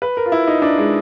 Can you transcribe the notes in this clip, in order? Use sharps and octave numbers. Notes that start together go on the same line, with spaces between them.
B4
A#4
F4
E4
D#4
D4
G#3